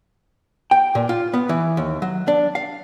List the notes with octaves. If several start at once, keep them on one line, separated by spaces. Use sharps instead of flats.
G5
A#2
F4
B3
E3
D#2
F#3
D4
F5